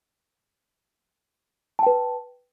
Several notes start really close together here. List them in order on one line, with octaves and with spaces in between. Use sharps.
A5 G5 B4